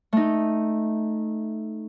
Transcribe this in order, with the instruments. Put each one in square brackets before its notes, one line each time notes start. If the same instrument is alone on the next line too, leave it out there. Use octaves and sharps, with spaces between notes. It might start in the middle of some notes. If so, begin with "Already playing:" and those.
[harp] A3 D#4